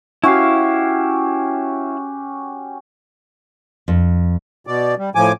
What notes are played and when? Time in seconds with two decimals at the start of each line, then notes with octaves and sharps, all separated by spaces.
0.24 C#4 E4 F#4 G4 F5
3.88 F2
4.67 B2 D5
4.98 G3
5.15 A2 F3 G#5 D6